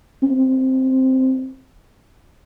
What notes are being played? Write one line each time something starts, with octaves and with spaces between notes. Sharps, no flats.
C4